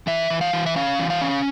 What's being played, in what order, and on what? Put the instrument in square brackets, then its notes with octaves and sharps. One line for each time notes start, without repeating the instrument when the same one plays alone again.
[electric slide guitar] E3 E5
E3
F5
E3
E5
C#4 F5
E3
F5
C#4